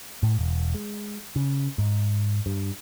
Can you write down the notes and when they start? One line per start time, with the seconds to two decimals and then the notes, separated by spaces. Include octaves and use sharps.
0.23 A2
0.39 E1
0.74 G#3
1.36 C#3
1.78 G#2
2.46 G2